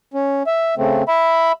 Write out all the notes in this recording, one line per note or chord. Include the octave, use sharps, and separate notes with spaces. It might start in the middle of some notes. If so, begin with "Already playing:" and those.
C#4
E5
C#3 A3 C4
E5 B5